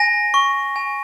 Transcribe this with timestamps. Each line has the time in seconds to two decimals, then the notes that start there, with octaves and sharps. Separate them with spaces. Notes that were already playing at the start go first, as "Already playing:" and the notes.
Already playing: G#5 A#6
0.34 C#6
0.76 G#5